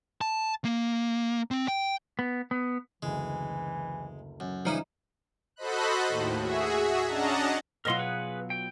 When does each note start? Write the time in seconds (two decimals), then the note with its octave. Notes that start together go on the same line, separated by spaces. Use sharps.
0.21 A5
0.65 A#3
1.51 C4
1.68 G5
2.19 B3
2.51 B3
3.02 F#1 D2 E3 G#3
4.40 F#2
4.65 C#3 E3 F3 G3 D#4 E4
5.56 F#4 A4 C5 D#5 B5 F#6
6.08 D#2 A2
6.40 F#4 G#4 E5
7.06 C#4 D4 D#5 F#5 A5 A#5
7.85 B2 F#3 F4 A#4 D#5 C6
7.99 G#4 B4 F#5
8.50 G5